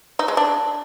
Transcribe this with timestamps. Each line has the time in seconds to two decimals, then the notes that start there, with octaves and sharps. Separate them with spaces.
0.19 D#4
0.28 G#3
0.37 D4